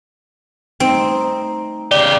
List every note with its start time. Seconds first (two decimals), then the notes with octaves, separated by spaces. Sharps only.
0.80 G3 A3 C4 D#4
1.91 C#3 G4 D5